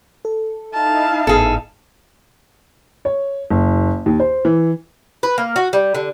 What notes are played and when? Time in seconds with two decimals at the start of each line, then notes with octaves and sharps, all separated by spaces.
0.25 A4
0.74 D#4 E4 F5 A5
1.27 G#1 A2 B3 G#4 A4
3.05 C#5
3.50 F#1
4.06 D#2
4.20 C5
4.45 E3
5.23 B4
5.38 A#3
5.56 F#4
5.73 G3
5.95 D3